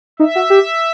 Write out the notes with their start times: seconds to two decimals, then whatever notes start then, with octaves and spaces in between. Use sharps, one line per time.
0.19 D#4 E5
0.35 F#4
0.50 G4